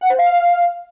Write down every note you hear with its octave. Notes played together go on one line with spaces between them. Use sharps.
F#5
C5
F5